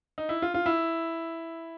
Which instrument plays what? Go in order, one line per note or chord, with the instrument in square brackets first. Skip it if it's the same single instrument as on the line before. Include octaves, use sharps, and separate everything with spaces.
[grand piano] D#4
E4
F4
F4
E4